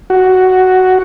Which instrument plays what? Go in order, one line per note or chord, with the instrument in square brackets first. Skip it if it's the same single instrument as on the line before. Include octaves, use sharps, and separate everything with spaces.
[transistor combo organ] F#4